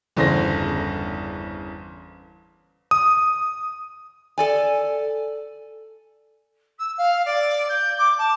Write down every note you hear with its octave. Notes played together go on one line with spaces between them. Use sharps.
G1 E2 C#3 C5 A#6
D#6
A4 D5 G#5
E6
F5
D5
G6
D6
A5